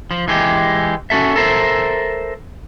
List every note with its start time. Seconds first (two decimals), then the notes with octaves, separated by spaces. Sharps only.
0.11 F3
0.28 E3 G#3 G4
1.10 C#4 F#4 A4 E5
1.36 A4 A#4 C5 E5